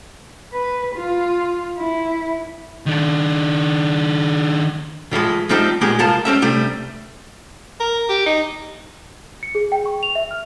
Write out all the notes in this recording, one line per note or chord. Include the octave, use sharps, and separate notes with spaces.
B4
F4
E4
D#3 D4
A2 E3 F3 G#3
F3 G3 C4 D#4 G4 E5
A#2 G#3 A#3 B3 G4 G#4
C2 F2 F3 F4 A#4 A5
G3 C4 C#4 E5
C3 G3 A3 D4
A#4
G4
D#4
C#7
G#4
G5
C#6
F7
E5
F6